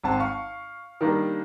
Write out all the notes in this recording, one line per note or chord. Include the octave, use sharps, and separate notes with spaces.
G#1 C4 A5
F5 C#6
D#3 G3 A#3 D4